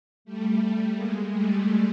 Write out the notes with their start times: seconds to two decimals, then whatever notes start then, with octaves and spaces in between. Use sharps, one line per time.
0.25 G3 A3
0.94 G#3 A#3
1.29 G3 A3